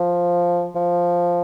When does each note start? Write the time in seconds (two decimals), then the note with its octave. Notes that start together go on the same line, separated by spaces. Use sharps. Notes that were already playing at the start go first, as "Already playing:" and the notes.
Already playing: F3
0.75 F3